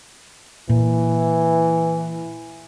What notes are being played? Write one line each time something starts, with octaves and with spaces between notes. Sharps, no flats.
A#2 E3